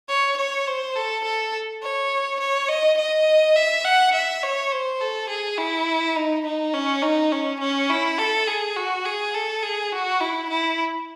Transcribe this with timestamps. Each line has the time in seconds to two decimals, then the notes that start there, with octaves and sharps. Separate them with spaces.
0.09 C#5
0.37 C#5
0.67 C5
0.95 A4
1.24 A4
1.82 C#5
2.40 C#5
2.69 D#5
2.98 D#5
3.56 E5
3.85 F#5
4.13 E5
4.43 C#5
4.72 C5
5.00 A4
5.29 G#4
5.58 E4
6.16 D#4
6.45 D#4
6.73 C#4
7.03 D#4
7.32 C#4
7.60 C#4
7.89 E4
8.18 A4
8.48 G#4
8.76 F#4
9.05 G#4
9.34 A4
9.63 G#4
9.92 F#4
10.20 E4
10.50 E4